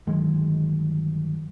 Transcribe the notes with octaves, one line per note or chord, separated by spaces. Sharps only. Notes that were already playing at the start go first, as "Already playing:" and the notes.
G1 D#3 F#3 G#3